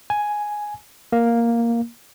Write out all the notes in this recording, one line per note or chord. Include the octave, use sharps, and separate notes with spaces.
G#5
A#3